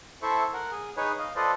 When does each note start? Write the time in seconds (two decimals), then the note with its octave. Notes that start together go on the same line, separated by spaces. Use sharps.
0.22 E4 A4 C5 E5 C#6
0.53 A#4 F#5
0.71 G#4
0.97 D#4 G#4 B4 C#5
1.19 D#5 F5
1.36 F4 A4 B4 C5 D5 D#5